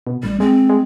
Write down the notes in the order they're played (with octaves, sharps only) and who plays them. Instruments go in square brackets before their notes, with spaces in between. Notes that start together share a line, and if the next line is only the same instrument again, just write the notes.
[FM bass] B2
[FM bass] A1 [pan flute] G3
[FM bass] G#3 [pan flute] C4
[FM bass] G#3